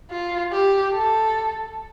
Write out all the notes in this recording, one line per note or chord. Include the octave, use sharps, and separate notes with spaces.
F4
G4
A4